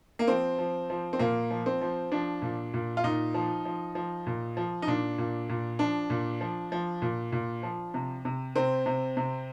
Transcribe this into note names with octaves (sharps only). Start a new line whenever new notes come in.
A#3
F3 C4
F3
F3
C4
A#2 A#3
F3
C4
F3
F3 D4
A#2
A#2
F4
A#2 D#4
F3
F3
F3
A#2
F3
D#4
A#2 D4
A#2
A#2
F3 D4
A#2
F3
F3
A#2
A#2
F3
C3
C3
C3 C4
C3
C3